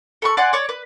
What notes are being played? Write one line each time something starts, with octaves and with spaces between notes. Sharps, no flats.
A4 B5 C#6
D5 F#5 G#5 C6
C#5 D5
B4